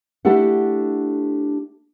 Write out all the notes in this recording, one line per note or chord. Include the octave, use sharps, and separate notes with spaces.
A3 D4 E4 G4 A4 F#5